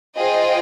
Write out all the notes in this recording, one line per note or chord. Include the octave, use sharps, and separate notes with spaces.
F4 G#4 C5 D#5 G5